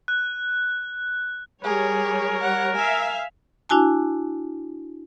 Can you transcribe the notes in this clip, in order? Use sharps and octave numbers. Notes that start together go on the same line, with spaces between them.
F#6
G3 G#4 A#4 C#5
F#5
E5 F5 G#5
D4 E4 F#4 G#5 A5